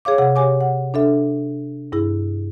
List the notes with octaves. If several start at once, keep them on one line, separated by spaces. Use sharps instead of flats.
G#4 C#5 F5 D6
C3 G#4 F#5
G4 C#5 G#5 D6
F#5
D4 A4 E5
G2 E4 G#4